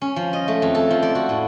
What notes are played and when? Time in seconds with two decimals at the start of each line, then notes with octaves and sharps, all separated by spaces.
0.02 C#4
0.16 F3
0.33 D#5
0.48 A3
0.62 F2
0.75 A4
0.90 F3
1.03 D5
1.15 F#4
1.29 A2